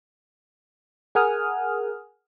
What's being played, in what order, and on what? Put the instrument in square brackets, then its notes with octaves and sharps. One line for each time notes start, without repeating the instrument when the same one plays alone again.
[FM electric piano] G#4 A#4 F#5 G#5 D#6 F6